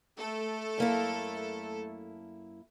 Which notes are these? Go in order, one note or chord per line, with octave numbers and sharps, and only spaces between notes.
A3 A4
F#2 A#3 E4